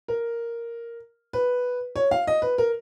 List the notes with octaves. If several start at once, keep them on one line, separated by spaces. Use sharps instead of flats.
A#4
B4
C#5
F5
D#5
B4
A#4